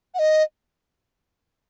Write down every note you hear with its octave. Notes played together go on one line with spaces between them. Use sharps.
F#5
D#5